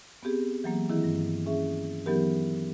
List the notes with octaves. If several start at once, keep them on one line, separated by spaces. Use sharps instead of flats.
B3 C4 G4 G#4
E3 F#3 A#3
D#3 E3 C4 E4 G#4
G2
C#4 G#4 E5
E3 F#3 B3 D#4 G4 A#4